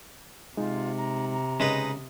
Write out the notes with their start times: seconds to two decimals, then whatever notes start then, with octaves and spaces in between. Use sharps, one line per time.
0.57 C3 G#3 D#4 F4
0.98 A#5
1.32 A#5
1.60 C#3 G#3 C#4 D#4 B4